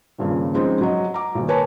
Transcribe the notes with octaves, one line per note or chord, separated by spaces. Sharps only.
D#1 G2 A#2 C#3
F3 G#3 C4 C#4 D#4
F#3 D#5
A#5 D6
D#1 B1
A#4 B4 C#5 G#5 A5